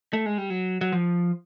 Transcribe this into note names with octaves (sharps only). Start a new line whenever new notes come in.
A3
G#3
G3
F#3
F#3
F3